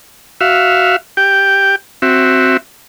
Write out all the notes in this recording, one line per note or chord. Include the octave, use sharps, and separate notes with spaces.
F#4 E5 F5
G4 G5
C4 F#4 E5